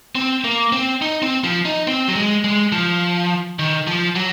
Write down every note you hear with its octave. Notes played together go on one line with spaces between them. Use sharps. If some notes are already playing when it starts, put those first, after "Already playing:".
C4
A#3
C4
D#4
C4
F3
D#4
C4
F#3
G#3
G#3
F3
D#3
F3
F#3